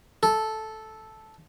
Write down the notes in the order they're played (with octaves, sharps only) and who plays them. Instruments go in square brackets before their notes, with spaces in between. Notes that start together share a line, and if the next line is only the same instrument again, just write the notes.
[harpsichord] A4